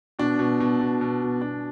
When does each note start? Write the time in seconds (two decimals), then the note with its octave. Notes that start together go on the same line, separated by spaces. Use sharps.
0.19 B2 D4
0.39 B2
0.60 B2
0.81 B2
1.01 B2
1.22 B2
1.41 B2 D4